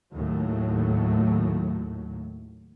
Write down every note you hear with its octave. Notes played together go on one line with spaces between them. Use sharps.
D#2 A2 F#3 A3